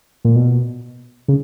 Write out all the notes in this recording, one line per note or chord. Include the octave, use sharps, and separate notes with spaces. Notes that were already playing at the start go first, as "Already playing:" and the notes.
A#2
B2
C#3